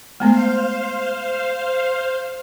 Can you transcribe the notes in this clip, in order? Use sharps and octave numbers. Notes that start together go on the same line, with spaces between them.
G#3 A3 B3 C5 F5